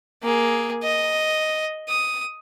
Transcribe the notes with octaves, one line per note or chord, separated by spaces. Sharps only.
A#3 G#4
D#5
D#6